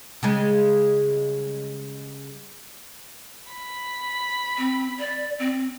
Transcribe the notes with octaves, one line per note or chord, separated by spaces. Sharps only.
C#3 G3 G#3
B5
C4
D5
C4